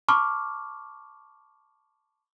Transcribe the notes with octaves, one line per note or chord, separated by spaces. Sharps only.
A5 B5 C#6 D6 F6